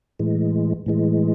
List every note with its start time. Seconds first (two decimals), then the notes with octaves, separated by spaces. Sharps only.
0.19 A2 E3 G#3
0.86 A2 E3 G#3